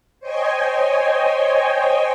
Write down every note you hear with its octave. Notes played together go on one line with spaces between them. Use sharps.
C5 C#5 D#5 G5 G#5